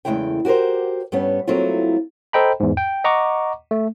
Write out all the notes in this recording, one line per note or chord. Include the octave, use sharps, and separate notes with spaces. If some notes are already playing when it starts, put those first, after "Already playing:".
E2 C#3 G#3 A3 E4 G5
F#4 G4 A4 A#4 C5
G2 G3 B3 C#4
F#3 A3 A#3 C4 E4 F4
A4 C5 D#5 G5 A#5 B5
E2 G#2
G5
D#5 F#5 A#5 C#6 D6
A3